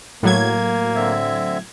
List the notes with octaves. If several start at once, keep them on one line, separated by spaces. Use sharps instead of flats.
A2 F#3 A#3 G#6
D3 C4 E5